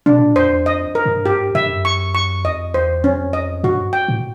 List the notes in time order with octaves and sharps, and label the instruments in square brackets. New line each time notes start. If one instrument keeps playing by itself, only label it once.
[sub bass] B2 [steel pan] D4
[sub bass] A#2
[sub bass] F2 [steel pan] C5
[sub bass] E2
[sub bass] F2 [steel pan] D#5
[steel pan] A#4
[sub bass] G2
[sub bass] G#2 [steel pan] G4
[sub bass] G2
[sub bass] G2 [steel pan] E5
[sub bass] F#2
[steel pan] C#6
C#6
[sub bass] F2 [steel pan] D#5
[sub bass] E2 [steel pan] C5
[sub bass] F2 [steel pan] C#4
[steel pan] D#5
[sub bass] G2 [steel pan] F#4
[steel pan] G5
[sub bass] A2